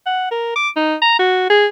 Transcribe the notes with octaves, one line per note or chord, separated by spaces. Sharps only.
F#5
A#4
D6
D#4
A#5
F#4
G#4